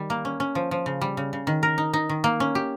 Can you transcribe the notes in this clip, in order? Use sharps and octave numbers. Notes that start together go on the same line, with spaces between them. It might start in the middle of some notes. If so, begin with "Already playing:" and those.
Already playing: D#3 G3
A#3
C#4
C#4
F3
F3
C#3
G3
C#3
C#3
D#3
A#4
D#4
D#4
D#3
A#3
C#4
G4